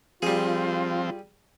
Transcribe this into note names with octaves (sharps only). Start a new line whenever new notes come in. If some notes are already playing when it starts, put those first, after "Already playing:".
F3 G3 C4 F4 G#4